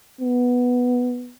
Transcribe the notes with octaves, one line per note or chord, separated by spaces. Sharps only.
B3